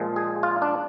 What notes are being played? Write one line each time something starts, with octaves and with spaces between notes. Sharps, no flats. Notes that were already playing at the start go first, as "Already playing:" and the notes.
Already playing: A#2 F3 G#3
G#4
F4
D4